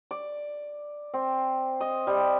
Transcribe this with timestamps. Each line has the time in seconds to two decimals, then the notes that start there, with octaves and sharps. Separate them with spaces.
0.11 D5
1.14 C4
1.81 D#5
2.07 G3